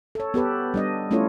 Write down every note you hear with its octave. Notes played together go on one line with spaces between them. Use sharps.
A4 C#5
B3 G4 A4 B4
G3 D4 D#5
A3 C#4 E4 F4 A4 C#5